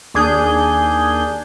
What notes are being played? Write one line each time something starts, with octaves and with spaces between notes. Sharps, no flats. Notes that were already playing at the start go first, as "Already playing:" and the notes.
D#2 D4 G#4 G6